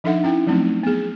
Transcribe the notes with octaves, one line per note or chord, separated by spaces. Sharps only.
F3 D4 D#4 A4 E5 F#5
C#4 E4 G5
F3 F#3 A3 C4 D#4
B3 G#4